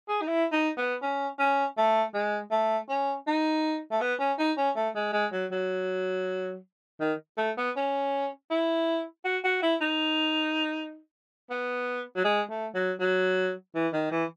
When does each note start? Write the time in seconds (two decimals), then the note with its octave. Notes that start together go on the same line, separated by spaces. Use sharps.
0.09 G#4
0.21 D#4
0.28 E4
0.52 D#4
0.77 B3
1.02 C#4
1.39 C#4
1.77 A3
2.14 G#3
2.52 A3
2.89 C#4
3.27 D#4
3.92 A3
4.01 B3
4.20 C#4
4.39 D#4
4.58 C#4
4.76 A3
4.96 G#3
5.13 G#3
5.33 F#3
5.52 F#3
7.00 D#3
7.38 A3
7.58 B3
7.76 C#4
8.51 E4
9.25 F#4
9.45 F#4
9.63 E4
9.81 D#4
11.50 B3
12.16 F#3
12.24 G#3
12.50 A3
12.75 F#3
13.00 F#3
13.75 E3
13.93 D#3
14.11 E3